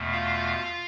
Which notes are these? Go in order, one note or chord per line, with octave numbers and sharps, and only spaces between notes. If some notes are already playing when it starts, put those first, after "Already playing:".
Already playing: E2 B2 A3
F4 F5